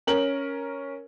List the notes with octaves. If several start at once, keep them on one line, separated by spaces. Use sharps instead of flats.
C#4 A#4 F#7